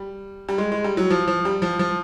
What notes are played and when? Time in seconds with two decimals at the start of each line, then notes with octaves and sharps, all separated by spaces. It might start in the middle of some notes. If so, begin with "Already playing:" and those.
Already playing: G3
0.49 G3
0.58 G#3
0.72 G#3
0.84 G3
0.97 F#3
1.10 F3
1.27 F3
1.45 G3
1.62 F3
1.79 F3